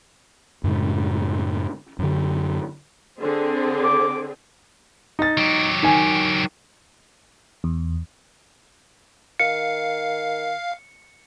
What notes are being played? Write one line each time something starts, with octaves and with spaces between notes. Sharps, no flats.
F#2 A2 C#3 G#3
F#2 D3
D3 C4 G#4
D6
D#4 A6
F#3 G4
D#3 G#5
E2
D#3 F5 C#7